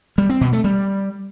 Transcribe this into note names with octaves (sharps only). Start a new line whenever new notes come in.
G3
C4
B2
A3
G3